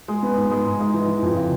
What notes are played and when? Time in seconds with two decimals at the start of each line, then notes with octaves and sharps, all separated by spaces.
0.08 G#3
0.23 B3
0.37 G#2
0.51 G#3
0.66 G#2
0.80 G#3
0.94 E3
1.08 E3
1.23 F2
1.36 C#3